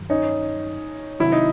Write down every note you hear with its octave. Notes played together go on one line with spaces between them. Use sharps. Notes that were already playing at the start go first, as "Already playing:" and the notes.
Already playing: G2 D#3 F#3
C#4 D#4
C3 D#3 F#3 E4
D#4